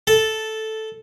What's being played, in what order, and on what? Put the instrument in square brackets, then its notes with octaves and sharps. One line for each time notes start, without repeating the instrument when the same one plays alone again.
[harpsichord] A4